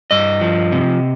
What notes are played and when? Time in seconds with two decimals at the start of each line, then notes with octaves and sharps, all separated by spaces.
0.11 G2 D#5
0.41 F3
0.72 C3